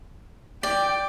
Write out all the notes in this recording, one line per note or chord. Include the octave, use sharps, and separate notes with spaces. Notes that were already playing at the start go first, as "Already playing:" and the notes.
D5 G5